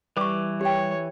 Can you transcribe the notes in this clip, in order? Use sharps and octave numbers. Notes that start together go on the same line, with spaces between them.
E3 G3 B4 C#6 D6
G4 C#5 G5